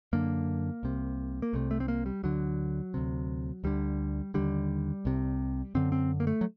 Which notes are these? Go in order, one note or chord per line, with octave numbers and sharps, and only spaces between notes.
F#2 D3 A#3
C2 C3
A#3
C2 C3 A3
A3
C4
A#3
G3
D2 D3 F#3
D2 C3
D2 D3 G3
D#2 D3 G3
C2 C3
F#2 D3 C4
C4
A#3
A3
F#3